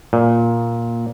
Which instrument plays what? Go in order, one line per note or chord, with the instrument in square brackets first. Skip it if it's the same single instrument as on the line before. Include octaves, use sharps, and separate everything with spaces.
[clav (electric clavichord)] A#2